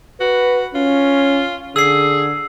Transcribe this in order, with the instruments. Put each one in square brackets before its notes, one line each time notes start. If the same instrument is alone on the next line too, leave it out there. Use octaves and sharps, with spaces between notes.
[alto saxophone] F#4 [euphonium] B4
[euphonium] C#4 [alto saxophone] F4
[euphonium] D3 [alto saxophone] G#4 [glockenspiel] E6 C7